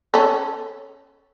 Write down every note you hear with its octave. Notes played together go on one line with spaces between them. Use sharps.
C#4 A4